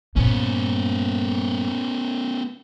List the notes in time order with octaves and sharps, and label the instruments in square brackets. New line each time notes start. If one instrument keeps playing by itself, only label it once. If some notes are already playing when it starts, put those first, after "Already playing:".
[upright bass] G2 A#2 [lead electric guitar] B3 C#4